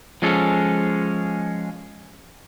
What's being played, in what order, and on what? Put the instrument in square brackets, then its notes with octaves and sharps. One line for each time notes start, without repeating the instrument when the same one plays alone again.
[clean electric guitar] F3 G#3 C#4 A4